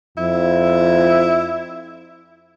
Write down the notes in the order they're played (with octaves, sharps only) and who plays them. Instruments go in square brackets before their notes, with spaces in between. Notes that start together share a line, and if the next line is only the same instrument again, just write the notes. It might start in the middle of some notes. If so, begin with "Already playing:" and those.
[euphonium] F2 [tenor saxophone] E4